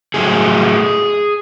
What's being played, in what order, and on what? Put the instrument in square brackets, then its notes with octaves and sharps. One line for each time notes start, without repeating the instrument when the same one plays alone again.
[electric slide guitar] A2 F#3 A3 G#4